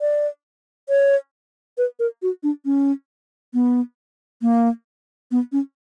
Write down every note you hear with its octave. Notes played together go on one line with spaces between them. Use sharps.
D5
C#5
B4
A#4
F#4
D4
C#4
B3
A#3
B3
C#4